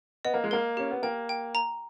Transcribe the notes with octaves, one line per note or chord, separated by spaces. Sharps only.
B3 D#5
A#3
G#3
A#3 A#4
C#4 G4
B3
A#3 G5
G5
A#5